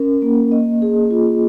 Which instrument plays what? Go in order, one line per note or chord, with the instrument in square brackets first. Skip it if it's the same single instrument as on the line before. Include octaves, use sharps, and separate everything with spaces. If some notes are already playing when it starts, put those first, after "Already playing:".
Already playing: [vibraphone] C#4 A#4
A#3
D#5
G#4
F4